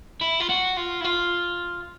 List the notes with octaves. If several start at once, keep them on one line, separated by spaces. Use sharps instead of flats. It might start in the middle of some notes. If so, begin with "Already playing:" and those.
E4
F4
F#4
F4
E4
F4